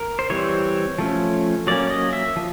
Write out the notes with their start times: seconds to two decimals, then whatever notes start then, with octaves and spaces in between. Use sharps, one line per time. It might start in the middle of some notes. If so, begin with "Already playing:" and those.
Already playing: A#4
0.19 C5
0.30 E3 G3 C4 C#5
0.98 F3 A3 C#4
1.67 F#3 A#3 C#4 D5
1.90 D#5
2.13 E5
2.36 F3